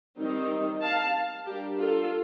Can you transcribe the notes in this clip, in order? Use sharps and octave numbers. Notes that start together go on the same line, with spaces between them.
D#3 G3 C4 D#4
F5 A5
G3 D4 G4 A#4
F4 A4